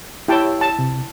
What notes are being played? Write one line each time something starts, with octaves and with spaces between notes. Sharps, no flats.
E4 G4 C#5 G5 A5
A5
C3